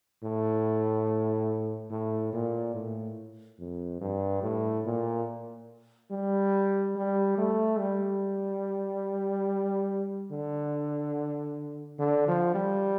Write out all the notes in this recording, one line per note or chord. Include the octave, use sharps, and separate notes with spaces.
A2
A2
A#2
A2
F2
G2
A2
A#2
G3
G3
A3
G3
D3
D3
F3
G3